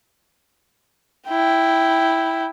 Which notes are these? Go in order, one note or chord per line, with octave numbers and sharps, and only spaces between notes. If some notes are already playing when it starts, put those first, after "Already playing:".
E4 G5